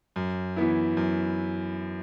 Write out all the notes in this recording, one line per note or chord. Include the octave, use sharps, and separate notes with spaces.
F#2
E3 B3 E4
F#2